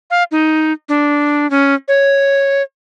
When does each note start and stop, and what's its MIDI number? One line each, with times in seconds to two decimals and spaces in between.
0.11 0.23 77
0.31 0.73 63
0.89 1.49 62
1.50 1.75 61
1.88 2.62 73